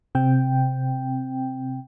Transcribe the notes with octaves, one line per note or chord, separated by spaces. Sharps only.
C3 C4 G5